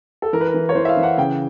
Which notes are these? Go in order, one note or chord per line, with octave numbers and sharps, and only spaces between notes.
A4
E3 A#4
B4
A#4
E3
C#5
E3 C5
E5
F5
E3
F#5
C#3 G5